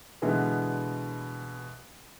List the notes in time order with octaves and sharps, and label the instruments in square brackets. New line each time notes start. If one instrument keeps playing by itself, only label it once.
[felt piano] B2 D3 E3 G#3 B3